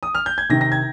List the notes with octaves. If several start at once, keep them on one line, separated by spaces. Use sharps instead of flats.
D#6
F6
G6
G#6
C3 D#3 A#6
A#6
G#6